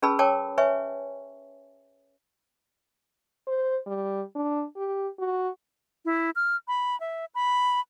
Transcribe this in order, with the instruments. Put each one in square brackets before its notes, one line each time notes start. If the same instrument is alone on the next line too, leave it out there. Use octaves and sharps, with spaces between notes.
[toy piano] C#4 G#4 B4 A5 B5 E6
A#4 C#5 G5 A5 D6
B4 C#5 E5 G#5 C#6
[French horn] C5
G3
D4
G4
F#4
[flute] E4
F6
B5
E5
B5